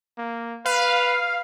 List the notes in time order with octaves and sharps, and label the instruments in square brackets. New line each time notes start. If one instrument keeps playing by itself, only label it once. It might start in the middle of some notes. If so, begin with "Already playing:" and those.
[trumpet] A#3
[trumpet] B4 [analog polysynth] F5